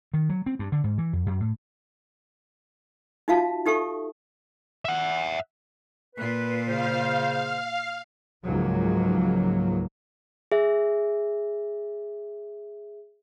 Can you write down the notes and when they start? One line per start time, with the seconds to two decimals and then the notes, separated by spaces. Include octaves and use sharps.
0.14 D#3
0.29 F#3
0.46 C4
0.59 G2
0.72 D3
0.84 G#2
0.98 E3
1.13 F2
1.26 F#2
1.40 A2
3.28 D#4 F4 F#4 E5 F5 A5
3.66 D#4 G4 A4 E5 C#6
4.85 E5 F#5
6.16 A#2 F4 B4
6.66 C#3 C5 F5
8.45 C#2 G#2 F3 F#3 A#3
10.52 G#4 E5